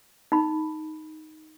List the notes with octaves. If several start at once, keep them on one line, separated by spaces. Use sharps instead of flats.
D#4 B5